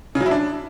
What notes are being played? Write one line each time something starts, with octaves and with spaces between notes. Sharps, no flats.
C#3
F#3
E4
D4